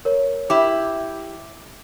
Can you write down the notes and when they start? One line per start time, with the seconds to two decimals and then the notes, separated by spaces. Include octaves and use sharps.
0.05 A#4 C#5
0.50 E4 G4 D6